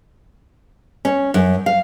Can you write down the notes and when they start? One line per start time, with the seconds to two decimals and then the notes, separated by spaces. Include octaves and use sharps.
1.05 C#4
1.34 F#2
1.66 F5